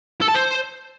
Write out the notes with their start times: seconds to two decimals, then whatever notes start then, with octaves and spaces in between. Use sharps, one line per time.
0.22 A4
0.29 A5
0.35 C5